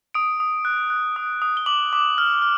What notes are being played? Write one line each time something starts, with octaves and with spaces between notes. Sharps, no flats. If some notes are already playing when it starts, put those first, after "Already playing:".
D#6 D7
D#6
F#6
F#6
D#6
D#6
G7
D6 F#7
D6
F6
F6